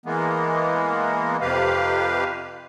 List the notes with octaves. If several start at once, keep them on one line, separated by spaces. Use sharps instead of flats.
E3 G#3 A#3 B3
F2 C3 G4 B4 F5